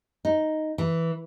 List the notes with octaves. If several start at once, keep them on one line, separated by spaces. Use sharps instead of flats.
D#4
E3